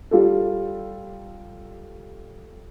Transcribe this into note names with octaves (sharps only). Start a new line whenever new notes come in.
G3 F4 G4 A4